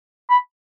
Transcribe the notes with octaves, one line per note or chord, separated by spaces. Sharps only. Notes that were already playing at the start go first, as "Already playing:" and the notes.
B5